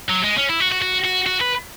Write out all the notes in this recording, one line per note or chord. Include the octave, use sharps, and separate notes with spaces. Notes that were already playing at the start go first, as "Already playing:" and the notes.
F#3
G#3
C#4
E4
F#4
F#4
F#4
F#4
F#4
B4